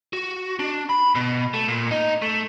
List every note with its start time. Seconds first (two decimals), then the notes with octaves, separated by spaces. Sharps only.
0.13 F#4
0.59 D4
0.89 B5
1.15 B2
1.54 A3
1.68 A#2
1.91 D#4
2.22 A3